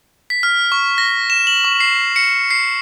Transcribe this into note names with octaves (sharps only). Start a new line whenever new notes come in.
B6
F6
C#6
A#6
E7
F#7
C#6
C7
C#7
C7